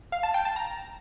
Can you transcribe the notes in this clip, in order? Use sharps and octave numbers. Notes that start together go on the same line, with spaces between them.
F5
A5
G5
A5
A#5